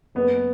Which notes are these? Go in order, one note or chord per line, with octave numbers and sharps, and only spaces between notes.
F#1 B3